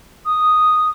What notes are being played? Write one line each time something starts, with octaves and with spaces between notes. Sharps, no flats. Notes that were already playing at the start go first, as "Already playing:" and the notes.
D#6